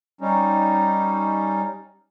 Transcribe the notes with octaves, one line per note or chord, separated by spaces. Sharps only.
G3 C#4 D#4